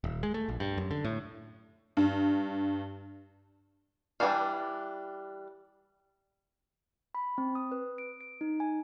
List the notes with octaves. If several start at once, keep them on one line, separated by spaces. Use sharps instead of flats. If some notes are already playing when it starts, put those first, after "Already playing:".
D#1
G#3
A3
A#1
G2
F#2
D3
A2
G2
E3 G3 D4 F#4 F5
B5
C4
D#6
B4
D7
D7
D#4
G#5